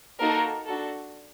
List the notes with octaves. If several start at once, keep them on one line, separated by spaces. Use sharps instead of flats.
A#3 D#4 F#4 A4 A#4
D4 F#4 A4